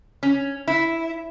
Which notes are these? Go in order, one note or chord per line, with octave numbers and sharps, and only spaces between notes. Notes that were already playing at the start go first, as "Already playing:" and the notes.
C#4
E4